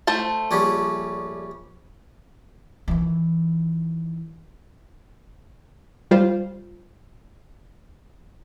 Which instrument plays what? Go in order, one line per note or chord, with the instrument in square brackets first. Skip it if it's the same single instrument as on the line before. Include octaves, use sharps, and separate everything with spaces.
[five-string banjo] A3 C5 A5
[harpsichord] A#1 G3 C#4
[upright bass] D#3 E3
[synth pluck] G3 F4 C5